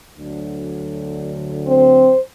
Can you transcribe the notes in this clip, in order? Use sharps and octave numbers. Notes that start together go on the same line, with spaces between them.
D2 D3 F#3
C4 C5